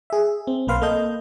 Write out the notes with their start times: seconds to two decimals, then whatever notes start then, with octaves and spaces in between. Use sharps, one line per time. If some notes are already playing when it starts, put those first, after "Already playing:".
0.10 G#4 E5
0.47 C4
0.67 B1 A#3 B4 F5 C6
0.82 A#3 A4 D#5 G6